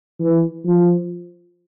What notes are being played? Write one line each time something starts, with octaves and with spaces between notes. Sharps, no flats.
E3
F3